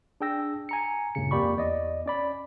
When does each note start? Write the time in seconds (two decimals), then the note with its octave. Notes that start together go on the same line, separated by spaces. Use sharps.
0.21 D4 G#4 G5 E6 A#6
0.69 G#5 A#5 C#7
1.15 C#2 G2 A#2 C#3 C#7
1.31 F2 A#3 G4 D5 B5 C#6
1.57 E2 D5 D#5
2.06 C#4 D5 B5